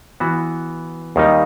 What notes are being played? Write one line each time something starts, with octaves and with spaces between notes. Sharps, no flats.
E3 B3 F#4
D#2 D#3 G3 D#4